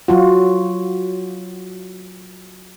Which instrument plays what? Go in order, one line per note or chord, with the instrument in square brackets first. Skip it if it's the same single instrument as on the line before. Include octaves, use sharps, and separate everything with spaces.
[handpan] F#3 F4 F#4